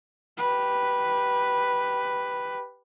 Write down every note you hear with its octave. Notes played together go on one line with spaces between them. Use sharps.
G4 B4